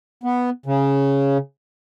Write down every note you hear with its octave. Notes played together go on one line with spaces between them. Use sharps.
B3
C#3